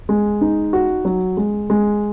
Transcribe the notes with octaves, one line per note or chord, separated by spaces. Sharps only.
G#3
D#4
F#4
F#3
G#3
G#3